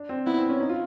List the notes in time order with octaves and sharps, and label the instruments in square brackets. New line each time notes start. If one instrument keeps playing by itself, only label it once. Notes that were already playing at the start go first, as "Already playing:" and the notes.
Already playing: [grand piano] D4
C4
[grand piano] B3 [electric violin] E4
[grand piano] C4
C#4
D#4
F4